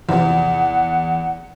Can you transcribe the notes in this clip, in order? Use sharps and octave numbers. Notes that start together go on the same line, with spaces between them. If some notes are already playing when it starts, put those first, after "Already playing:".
E2 C3 E3 F3 F#5